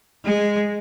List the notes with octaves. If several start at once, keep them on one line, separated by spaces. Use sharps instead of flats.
G#3